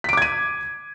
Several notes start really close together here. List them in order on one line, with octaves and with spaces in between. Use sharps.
B6 D7 D6 G#6 D#7